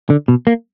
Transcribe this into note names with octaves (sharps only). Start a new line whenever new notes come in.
D3
B2
A#3